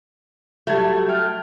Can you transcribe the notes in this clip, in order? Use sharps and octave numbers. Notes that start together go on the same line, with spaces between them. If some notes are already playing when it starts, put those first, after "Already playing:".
F#3 G3 A3 G#6
G5 F6